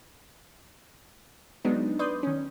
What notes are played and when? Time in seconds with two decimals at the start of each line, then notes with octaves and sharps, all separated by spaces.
1.65 F#3 G#3 B3 D4 D#4
1.99 B4 D5 C6 D#6 G6
2.23 D#3 C#4